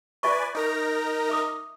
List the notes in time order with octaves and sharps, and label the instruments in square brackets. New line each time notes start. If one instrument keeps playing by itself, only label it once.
[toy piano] F4 E5 C#6 [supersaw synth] B4 D5 G#5
[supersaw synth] D#4 A#4 A#5
[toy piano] E5 D6 D#6